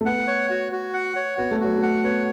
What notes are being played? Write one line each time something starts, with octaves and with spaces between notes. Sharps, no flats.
A3
B3 F#5
C#5
F#4
F#4
F#5
C#5
B3 F#4
A3
F#3 F#4
A3
F#5
B3 C#5